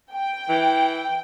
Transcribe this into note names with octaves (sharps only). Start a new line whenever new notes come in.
G5
E3